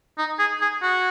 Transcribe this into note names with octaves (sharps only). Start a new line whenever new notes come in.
D#4
G#4
G#4
F#4